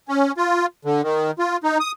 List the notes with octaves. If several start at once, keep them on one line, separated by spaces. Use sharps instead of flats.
C#4
F4
D3
D#3
F4
D#4
D#6